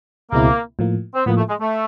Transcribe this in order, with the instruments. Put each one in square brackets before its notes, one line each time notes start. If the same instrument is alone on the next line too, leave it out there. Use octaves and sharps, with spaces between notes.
[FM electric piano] C#2 B2 G#3 C4 E4 [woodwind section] A#3
[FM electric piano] A2 F3 A#3
[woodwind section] C4
[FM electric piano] A2 F3 A#3 [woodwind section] B3
[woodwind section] A3
G#3
A3